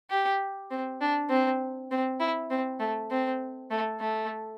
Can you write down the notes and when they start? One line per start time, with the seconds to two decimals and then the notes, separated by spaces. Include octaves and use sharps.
0.11 G4
0.71 C4
1.01 D4
1.30 C4
1.91 C4
2.20 E4
2.50 C4
2.80 A3
3.11 C4
3.71 A3
4.00 A3